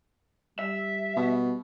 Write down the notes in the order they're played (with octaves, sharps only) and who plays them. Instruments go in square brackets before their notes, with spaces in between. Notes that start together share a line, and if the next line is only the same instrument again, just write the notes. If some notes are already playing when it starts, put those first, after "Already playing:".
[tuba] G3 [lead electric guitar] E5
[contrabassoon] B2